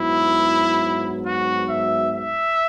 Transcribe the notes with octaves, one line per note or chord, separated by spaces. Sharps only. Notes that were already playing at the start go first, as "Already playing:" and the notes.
Already playing: G#2 F#3 B3 E4
F#4
E5
E5